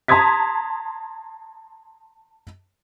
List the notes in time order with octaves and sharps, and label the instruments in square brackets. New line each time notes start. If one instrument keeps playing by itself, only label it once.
[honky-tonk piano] A5 A#5 C6 D#6 G#6 B6